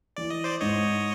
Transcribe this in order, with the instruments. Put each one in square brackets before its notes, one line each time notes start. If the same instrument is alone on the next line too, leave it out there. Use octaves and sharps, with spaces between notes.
[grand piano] E3 [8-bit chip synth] D5
[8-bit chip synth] D#5
C5 D5
[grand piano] G#2 [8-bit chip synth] C#5 D#5